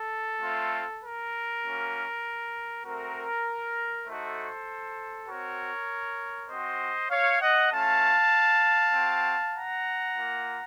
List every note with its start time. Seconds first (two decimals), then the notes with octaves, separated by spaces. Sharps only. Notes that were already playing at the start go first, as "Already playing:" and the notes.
Already playing: A4
0.41 A3 C4 F4
1.02 A#4
1.62 A#3 C#4 F#4
2.84 A3 C4 F#4 A#4
4.06 A3 D#4 F#4 A4 C5
5.28 C4 F#4 A#4 C#5
6.50 C4 F#4 C5 D#5
7.10 C#5 F5
7.41 D#5 F#5
7.72 A3 C#4 F4 F5 A5
8.94 C4 F#4
9.55 F#5 A#5
10.16 A#3 F4